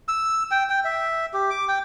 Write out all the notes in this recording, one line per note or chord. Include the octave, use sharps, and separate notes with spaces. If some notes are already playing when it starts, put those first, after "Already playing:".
E6
G5
G5
E5
G4
D6
G5